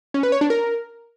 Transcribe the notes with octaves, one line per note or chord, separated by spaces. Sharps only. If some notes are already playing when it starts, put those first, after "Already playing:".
C#4
B4
C#5
D4
A#4